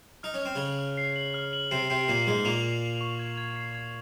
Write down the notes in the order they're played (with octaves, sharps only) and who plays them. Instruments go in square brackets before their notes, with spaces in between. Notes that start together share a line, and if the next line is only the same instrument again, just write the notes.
[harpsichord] D#4 [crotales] F6
[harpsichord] C#4
[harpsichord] C4 [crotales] F6
[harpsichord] C#3 C#4 [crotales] F#7
[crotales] F6
C7
F#7
F6
F#7
[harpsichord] C3 C4 [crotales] C7
[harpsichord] C3 C4 [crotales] C7
[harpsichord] A#2 A#3 [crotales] C7
[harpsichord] G#2 G#3 [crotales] C7
[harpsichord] A#2 A#3 [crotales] F7
[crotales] F7
C7
C#6
G#6
G#6
C7
G#6